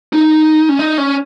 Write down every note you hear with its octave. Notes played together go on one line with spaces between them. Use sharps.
D#4
C#4
D#4
C#4